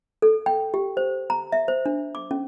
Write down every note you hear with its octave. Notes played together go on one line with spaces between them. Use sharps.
A4
G5
G4
C5
A#5
E5
C5
D4
D6
C#4